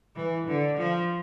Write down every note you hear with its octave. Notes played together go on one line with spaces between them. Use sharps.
E3
D3
F3